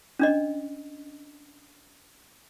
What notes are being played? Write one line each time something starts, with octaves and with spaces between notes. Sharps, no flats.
C#4 D4 D#5